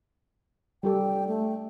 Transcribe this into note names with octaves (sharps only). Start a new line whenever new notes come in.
G3 G4 A4 G5
A3